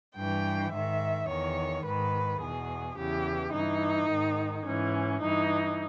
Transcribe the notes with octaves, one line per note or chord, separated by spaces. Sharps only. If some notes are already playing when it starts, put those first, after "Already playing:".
G2 E3 G5
G#2 D#3 E5
E2 D#3 C#5
G#2 D#3 B4
E2 B2 G#4
E2 C#3 E3 G4
G2 E3 D#4
G#2 D#3
G#2 E3 C#4
G2 E3 D#4